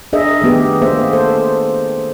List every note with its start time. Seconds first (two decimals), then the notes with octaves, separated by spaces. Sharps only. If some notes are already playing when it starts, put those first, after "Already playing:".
0.13 D4 G#4 A#4 D#5 E5
0.42 D#3 A3 B3 G4 G#4
0.82 A#3 G#4 C5 E5
1.13 A4 C5